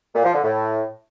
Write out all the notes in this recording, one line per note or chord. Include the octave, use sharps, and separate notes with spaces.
A#2
F3
D3
A2